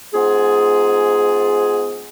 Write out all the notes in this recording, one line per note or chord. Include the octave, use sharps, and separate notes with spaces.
G#2 B3 F4 G#4